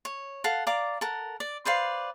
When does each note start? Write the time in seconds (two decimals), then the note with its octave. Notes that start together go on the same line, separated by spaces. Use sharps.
0.05 C#5
0.44 A4 F5 F#5
0.67 D5 F5 A#5 D6
1.01 A4 A#4 F#5
1.40 D5
1.65 B4 C5 D5 F5